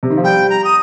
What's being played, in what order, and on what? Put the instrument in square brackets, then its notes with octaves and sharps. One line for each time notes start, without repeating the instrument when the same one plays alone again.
[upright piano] C3
D#3
F3
[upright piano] G3 [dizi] G5
[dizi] A#5
D#6